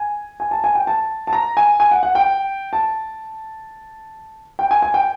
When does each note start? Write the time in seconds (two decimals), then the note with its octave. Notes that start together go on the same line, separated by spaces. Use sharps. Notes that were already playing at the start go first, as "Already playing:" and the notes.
Already playing: G#5
0.40 G#5
0.51 A5
0.64 G#5
0.75 G5
0.87 A5
1.27 A5
1.33 A#5
1.57 G#5
1.80 G#5
1.91 F#5
2.03 F#5
2.15 G5
2.73 A5
4.59 G5
4.71 G#5
4.82 G#5
4.94 G5